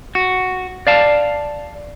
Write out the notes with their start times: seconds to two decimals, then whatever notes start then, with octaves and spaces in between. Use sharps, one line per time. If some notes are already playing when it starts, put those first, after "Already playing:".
0.15 F#4
0.87 D5 F5 A5